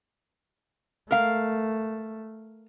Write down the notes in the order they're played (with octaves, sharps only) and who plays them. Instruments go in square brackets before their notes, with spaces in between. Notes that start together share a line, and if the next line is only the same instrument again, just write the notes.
[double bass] A3 [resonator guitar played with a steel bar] A#4 F5